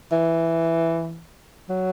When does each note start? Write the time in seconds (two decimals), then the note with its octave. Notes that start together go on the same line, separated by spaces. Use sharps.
0.12 E3
1.70 F#3